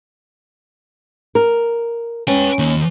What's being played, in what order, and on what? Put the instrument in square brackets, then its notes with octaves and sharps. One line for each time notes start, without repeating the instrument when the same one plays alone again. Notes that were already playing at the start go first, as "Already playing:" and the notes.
[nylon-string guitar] A#4
[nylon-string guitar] C#4 [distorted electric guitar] B4 G5
[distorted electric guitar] D#3 A#3